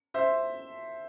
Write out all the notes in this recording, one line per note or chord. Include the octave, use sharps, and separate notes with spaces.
C5 E5